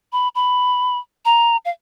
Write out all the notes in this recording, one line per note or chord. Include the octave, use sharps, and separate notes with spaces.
B5
B5
A#5
F5